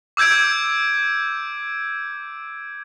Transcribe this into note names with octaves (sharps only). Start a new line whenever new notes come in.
D6 E6 G6 G#6 D7